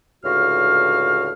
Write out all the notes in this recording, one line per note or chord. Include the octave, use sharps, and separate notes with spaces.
C#2 A2 D3 F#4 F5 F6